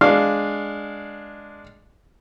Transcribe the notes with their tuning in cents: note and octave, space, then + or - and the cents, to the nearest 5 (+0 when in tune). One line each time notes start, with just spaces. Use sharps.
G#3 +0 D4 +0 F5 +0